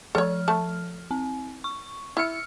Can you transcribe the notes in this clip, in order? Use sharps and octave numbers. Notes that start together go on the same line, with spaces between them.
F3 A4 C#5 F6
A3 A5
C4
C#6
E4 E6 F6 C#7